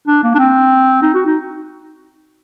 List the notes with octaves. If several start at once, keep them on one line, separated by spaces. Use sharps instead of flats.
D4
A#3
D4
C4
D#4
F#4
D#4